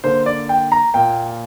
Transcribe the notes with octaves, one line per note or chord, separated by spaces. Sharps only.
D3 A#3 C5
D5
G5
A#5
A#2 A#3 G5